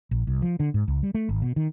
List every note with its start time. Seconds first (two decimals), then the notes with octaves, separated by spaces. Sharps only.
0.11 A#1
0.27 C2
0.42 F3
0.60 D3
0.74 G#2
0.88 C#2
1.03 G3
1.14 A3
1.29 G#1
1.42 B2
1.56 D#3